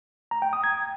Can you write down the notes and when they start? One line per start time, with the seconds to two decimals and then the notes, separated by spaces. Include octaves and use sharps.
0.31 A#5
0.42 G5
0.53 D#6
0.64 G#6